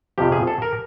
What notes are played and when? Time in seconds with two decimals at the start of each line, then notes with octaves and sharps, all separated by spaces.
0.18 F2 C3 F3 G4
0.32 G#4
0.47 A4
0.62 A#4